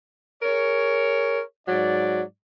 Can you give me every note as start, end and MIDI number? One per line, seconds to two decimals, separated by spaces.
0.42 1.41 68
0.42 1.41 70
0.42 1.41 73
1.67 2.22 44
1.67 2.22 54
1.67 2.22 74